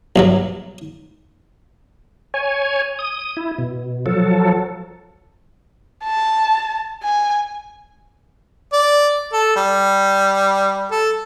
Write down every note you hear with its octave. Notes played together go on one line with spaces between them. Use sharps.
B1 G2 F#3
C#5 G#5
D#6
E4
B2
F3 F#3 A4
A5
G#5
D5
A4
G3
A4